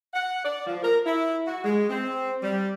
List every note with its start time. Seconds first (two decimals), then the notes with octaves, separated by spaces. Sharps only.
0.14 F#5
0.45 D5
0.67 F3
0.83 A#4
1.06 E4
1.47 F#4
1.64 G#3
1.90 C4
2.42 G3